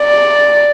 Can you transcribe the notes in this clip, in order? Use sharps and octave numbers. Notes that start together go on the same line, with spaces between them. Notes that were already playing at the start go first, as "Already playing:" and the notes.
Already playing: D5